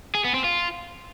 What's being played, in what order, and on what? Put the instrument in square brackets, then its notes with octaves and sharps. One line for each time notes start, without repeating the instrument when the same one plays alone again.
[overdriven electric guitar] G#4
B3
C4
F4